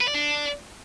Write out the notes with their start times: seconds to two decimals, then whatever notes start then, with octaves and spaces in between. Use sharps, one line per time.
0.01 B4
0.08 D5
0.15 D4